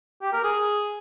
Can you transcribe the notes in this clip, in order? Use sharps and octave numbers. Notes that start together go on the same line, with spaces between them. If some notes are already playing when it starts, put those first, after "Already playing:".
G4
A#4
G#4